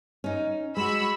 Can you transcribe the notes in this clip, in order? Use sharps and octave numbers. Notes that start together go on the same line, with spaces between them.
C#4 D#4
G#3 F#4 B5 E6